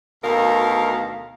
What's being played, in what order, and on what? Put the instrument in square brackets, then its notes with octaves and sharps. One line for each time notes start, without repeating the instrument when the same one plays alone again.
[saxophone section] D2 B2 D#3 A#4 F5